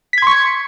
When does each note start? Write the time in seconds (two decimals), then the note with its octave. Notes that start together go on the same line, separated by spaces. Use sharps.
0.13 B6
0.18 G#6
0.22 C6
0.27 C#6
0.31 C#7